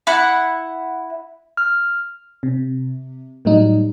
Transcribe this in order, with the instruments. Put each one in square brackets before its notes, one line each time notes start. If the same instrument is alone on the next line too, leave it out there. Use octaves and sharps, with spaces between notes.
[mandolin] E4 F#5
[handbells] F6
[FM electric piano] C3
A2 F#3 G3 D#4